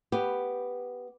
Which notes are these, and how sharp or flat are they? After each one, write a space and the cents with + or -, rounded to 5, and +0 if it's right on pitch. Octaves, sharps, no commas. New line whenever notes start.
B3 +0 G4 +0